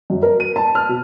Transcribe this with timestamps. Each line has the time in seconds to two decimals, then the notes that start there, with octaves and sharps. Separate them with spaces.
0.10 F#2
0.23 A#4
0.40 D#7
0.56 A5
0.75 F6
0.89 B2